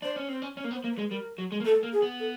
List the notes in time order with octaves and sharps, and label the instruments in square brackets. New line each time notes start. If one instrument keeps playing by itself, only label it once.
[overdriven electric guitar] D4 [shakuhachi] C5
[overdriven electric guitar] C#4
[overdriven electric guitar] C4 [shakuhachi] C5
[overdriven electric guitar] C#4
[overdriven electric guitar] C#4 [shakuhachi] C#5
[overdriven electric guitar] A#3
B3
[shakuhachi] C5
[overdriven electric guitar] A#3
[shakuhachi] B4
[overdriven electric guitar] G#3
[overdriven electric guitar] G3 [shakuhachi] A#4
[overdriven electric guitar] F#3
G#3
A#3
[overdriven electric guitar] A3 [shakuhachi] A4
[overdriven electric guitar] A#3
[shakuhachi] G#4
[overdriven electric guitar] B3
[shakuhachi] A4